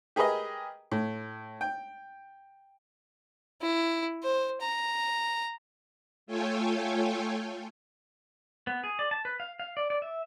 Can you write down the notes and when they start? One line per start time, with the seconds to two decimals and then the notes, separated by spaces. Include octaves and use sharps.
0.16 G4 G#4 A#4 B4 D#5
0.92 A2
1.61 G5
3.62 E4
4.23 C5
4.61 A#5
6.27 A3 F4 A4 C#5 G5 G#5
8.67 B3
8.84 G#4
8.99 D5
9.11 A5
9.25 B4
9.40 F5
9.60 F5
9.77 D5
9.90 D5
10.02 E5